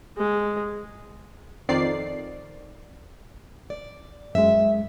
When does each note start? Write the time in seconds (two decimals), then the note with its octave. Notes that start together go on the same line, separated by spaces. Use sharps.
0.17 G#3
1.69 F2 D#3 D5 C7
3.70 D5
4.35 F#2 G#3 E5